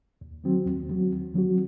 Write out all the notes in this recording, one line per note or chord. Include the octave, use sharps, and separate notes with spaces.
D#2
D#3 F#3 C4 F#4
D#2
D#3 F#3 C4 F#4
D#2
D#3 F#3 C4 F#4